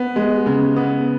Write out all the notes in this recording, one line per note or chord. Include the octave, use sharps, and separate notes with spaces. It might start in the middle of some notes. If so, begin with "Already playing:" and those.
Already playing: B3
G#3
C#3
B3